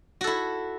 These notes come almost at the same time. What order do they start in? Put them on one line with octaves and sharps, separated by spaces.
F#4 A4 E4